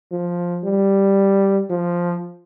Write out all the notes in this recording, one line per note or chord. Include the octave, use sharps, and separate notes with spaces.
F3
G3
F3